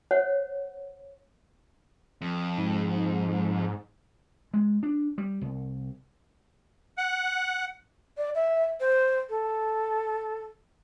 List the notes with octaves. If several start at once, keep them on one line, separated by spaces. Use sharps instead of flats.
C5 C#5 F#5
F2
G#2
G#3
D4
G3
C2
F#5
D5
E5
C5
A4